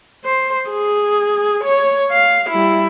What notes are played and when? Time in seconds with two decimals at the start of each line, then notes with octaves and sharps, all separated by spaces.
0.25 C5
0.70 G#4
1.64 C#5
2.12 F5
2.50 G3 E4